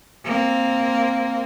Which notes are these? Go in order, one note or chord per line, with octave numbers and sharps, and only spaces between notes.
A#3 C4